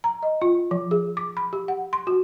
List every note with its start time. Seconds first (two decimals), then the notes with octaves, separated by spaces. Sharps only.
0.04 A#5
0.23 D#5
0.42 F4
0.71 F3
0.91 G#4
1.17 D6
1.37 B5
1.53 G4
1.68 F#5
1.93 C6
2.07 F#4